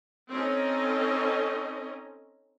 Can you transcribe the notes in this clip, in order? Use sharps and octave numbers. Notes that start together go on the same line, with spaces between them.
C4 C#4 D#4 A4 D#5